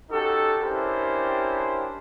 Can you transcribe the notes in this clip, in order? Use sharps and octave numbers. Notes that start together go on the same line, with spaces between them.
C#4 D#4 F#4 G4 A4
C#4 D4 E4 G4 A#4 C5